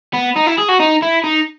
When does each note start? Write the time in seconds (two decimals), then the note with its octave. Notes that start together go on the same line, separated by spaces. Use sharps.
0.14 B3
0.36 D#4
0.47 E4
0.58 G#4
0.69 F#4
0.80 D#4
1.02 E4
1.24 D#4